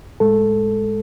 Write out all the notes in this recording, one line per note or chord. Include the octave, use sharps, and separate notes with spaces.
A2 G#3 A4